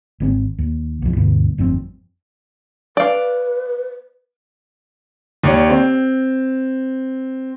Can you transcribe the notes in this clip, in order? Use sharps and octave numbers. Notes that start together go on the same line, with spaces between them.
G#1 C#3 C4
D#2
B1 F2
D2 G2 B2
G1 F2 A2 C4
B4 D5 F5
D#2 C#5 D5
C4